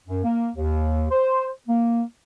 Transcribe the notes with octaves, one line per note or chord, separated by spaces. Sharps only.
F#2
A#3
D#2
C5
A#3